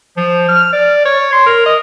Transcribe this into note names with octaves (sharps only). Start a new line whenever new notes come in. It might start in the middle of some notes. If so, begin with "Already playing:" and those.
F3
F6
D5
C#5
C6
A#4
D#5